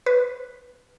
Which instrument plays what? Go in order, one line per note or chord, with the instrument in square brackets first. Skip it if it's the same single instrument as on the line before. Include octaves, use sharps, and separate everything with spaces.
[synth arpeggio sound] B4